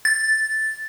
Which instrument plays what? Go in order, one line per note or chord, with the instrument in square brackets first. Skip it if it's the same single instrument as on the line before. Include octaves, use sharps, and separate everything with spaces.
[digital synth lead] A6